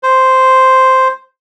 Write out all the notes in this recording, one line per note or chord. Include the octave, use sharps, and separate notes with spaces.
C5